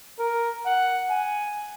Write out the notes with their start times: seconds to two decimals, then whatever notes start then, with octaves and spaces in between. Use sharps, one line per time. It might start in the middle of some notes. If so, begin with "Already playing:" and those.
0.19 A#4
0.66 F#5
1.10 G#5